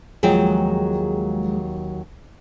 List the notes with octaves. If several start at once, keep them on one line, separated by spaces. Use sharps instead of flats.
D#2 F3 F#3 G#3 G#4 G5